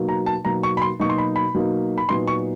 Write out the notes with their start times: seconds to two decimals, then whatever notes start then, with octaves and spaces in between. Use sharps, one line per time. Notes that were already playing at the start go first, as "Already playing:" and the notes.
Already playing: B2 F#3 A#3 D#4
0.09 A#5
0.26 A5
0.45 B2 F#3 A#3 D#4 A#5
0.63 C#6
0.77 B5
0.82 C6
1.00 B2 F#3 A#3 D#4 C#6
1.10 C6
1.18 B5
1.36 B5
1.54 B2 F#3 A#3 D#4
1.98 B5
2.09 A#2 F#3 B3 D#4 C6
2.27 C#6